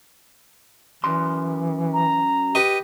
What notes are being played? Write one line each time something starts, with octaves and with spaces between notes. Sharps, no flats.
F#2 E3 C6
A#5
G4 B4 D#5